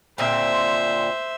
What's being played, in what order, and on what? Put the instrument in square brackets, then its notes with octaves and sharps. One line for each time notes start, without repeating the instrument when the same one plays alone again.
[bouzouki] A#2 D3 C4 [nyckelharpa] C5 E5